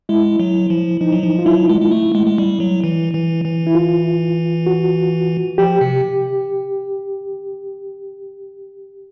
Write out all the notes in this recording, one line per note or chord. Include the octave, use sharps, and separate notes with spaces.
G#3 E4
F#3
F3
F3 D#4
F#3
F3
F4
F#3 E4
G#3
G#3
A3
G#3
G#3
G3
F#3
E3
E3
E3
E4
F4
F#4
F3 G4
C3